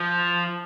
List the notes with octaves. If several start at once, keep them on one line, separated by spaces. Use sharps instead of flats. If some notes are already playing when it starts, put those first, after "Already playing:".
Already playing: F3